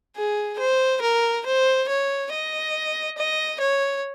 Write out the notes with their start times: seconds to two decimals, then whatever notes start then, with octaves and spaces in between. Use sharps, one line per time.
0.16 G#4
0.59 C5
1.02 A#4
1.46 C5
1.89 C#5
2.32 D#5
3.18 D#5
3.61 C#5